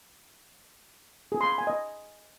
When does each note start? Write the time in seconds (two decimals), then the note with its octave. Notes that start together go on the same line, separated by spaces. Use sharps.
1.32 G#4
1.41 C6
1.49 B5
1.58 G#5
1.67 D#5